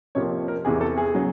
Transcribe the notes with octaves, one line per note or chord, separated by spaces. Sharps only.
F2 C3 F3 A#3 C#5
A#4
E2 C3 E3 G#4
A4
G#4
C#3 F#3